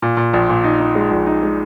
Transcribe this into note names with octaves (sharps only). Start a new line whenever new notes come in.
A#2
A#2
A#1
A#2
D#4
D#4
G#3
A#1
D#4
G#3